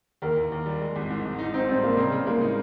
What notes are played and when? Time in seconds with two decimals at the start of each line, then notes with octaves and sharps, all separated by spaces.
0.22 D#2 A#4
0.37 D#2
0.52 D#2
0.66 G3
0.81 G#3
0.96 G#1
1.10 G#2
1.25 G#1
1.39 D#4
1.54 C4 D#4
1.68 G3 C4
1.83 G3 A#3
1.97 C#3 C4
2.12 C#3
2.26 G#3 A#3
2.41 D#4